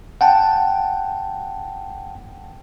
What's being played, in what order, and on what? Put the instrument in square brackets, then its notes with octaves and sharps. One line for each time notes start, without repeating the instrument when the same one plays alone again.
[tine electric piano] F#5 G5 A5